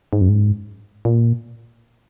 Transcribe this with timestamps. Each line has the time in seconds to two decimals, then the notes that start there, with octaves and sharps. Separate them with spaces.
0.13 G#2
0.21 F#2
0.29 G#2
1.05 A#2